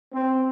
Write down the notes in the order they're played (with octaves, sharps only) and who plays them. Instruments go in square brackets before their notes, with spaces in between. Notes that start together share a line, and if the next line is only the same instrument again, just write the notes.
[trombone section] C4